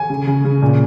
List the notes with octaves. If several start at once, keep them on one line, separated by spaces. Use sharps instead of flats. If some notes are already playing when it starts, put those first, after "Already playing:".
Already playing: G#5
C#3
C#3
C#3
A#2